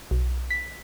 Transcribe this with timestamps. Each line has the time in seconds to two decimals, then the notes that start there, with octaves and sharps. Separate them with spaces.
0.11 B1
0.50 B6